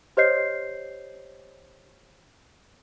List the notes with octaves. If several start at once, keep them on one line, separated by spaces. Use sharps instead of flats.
G4 C5 C#5 D#5 G6 C7